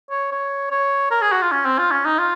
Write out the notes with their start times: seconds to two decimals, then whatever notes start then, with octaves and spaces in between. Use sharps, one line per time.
0.10 C#5
0.32 C#5
0.71 C#5
1.11 A#4
1.22 G#4
1.32 F#4
1.42 F4
1.52 C#4
1.65 C4
1.78 F4
1.92 C#4
2.05 D#4
2.19 F4